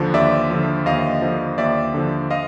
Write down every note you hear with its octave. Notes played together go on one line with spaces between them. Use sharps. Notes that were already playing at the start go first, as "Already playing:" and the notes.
Already playing: D#2 D3 F3
D#2 D5 E5
D3 F3
D#2 D#5 F5
D3 F3
D#2 D5 E5
D3 F3
D#5 F5